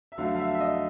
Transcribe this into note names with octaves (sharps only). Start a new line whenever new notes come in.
E5
F2 D3 F#3 A3 F5
F5
E5
E5
D#5